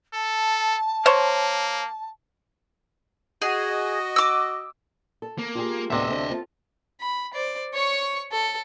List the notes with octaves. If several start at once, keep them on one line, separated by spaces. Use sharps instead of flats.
A4 A5
A#3 C5 C#5
F#4 G#4 D#5
D6 E6
A4
A#3
F4 G4 G#4
D2 A2 C3 B3 D4 D#5 E5
D3 C4
C4 F4 A4
B5
C5 D5
C#5 C#6
A4